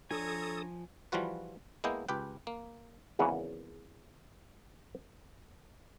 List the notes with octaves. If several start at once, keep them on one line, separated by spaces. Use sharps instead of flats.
F3 D4 A4 C#5 G#5 A#5 D#6
E3 F3 G3 F4 F#4 B4
G#3 A#3 B3 E4 D#5 G5
C#2 G4 B4 G5
A#3
G#1 E2 C#3 E3 A#4 F#5